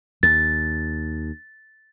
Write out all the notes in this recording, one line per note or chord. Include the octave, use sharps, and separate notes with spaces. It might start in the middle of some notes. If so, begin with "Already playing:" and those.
D#2 A6